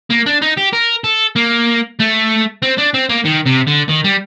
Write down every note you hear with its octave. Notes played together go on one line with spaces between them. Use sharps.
A#3
D4
D#4
G4
A#4
A4
A#3
A3
C4
D4
C4
A#3
D#3
C3
D3
D#3
G3